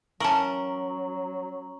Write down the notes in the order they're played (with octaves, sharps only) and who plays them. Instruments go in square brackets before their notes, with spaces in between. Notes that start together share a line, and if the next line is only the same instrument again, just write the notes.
[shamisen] E3 A5 [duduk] F#3 [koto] C#4 A#4 [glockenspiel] A#5 C#6 F#7